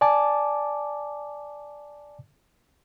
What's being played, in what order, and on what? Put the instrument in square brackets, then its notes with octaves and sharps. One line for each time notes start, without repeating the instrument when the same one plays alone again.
[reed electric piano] D5 G#5 A5 D6